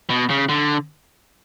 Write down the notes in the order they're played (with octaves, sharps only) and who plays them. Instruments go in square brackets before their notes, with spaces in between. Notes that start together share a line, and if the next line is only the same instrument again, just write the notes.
[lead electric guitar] B2
C#3
D3